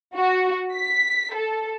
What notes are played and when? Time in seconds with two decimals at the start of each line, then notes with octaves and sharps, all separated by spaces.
0.15 F#4
0.73 B6
1.35 A4